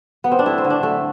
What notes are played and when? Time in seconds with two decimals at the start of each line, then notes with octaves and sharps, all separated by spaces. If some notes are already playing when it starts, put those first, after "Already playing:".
0.24 B3
0.32 C4
0.39 D4
0.46 A3 E4
0.58 C4
0.64 D3
0.70 D4
0.83 A3